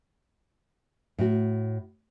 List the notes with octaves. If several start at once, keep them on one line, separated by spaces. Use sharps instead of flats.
A2 F#4